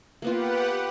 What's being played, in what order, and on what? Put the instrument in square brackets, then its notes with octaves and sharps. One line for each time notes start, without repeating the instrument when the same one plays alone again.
[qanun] A#3 B3 F4 [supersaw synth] G4 B4 F#5